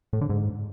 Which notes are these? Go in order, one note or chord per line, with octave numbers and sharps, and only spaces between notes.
A2
D3
G#2